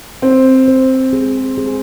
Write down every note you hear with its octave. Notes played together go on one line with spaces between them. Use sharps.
C4 C5
C5
G#4
G#4